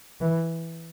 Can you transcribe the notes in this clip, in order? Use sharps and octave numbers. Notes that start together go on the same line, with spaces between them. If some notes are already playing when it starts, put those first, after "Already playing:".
E3